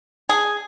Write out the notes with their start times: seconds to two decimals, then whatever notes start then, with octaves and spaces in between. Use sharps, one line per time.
0.29 G#4